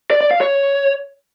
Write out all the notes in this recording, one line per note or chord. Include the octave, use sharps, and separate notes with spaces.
D5
D5
F5
C#5